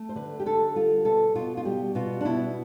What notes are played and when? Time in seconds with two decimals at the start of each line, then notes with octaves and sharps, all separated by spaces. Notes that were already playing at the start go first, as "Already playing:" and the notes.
Already playing: A3
0.09 C5
0.15 D3 B4
0.40 G4
0.46 D3 A4
0.75 G3 F4
1.05 B2 A4
1.35 B2 F4
1.57 F4
1.65 G3 G4
1.95 B2 F4
2.21 D4
2.25 B2 E4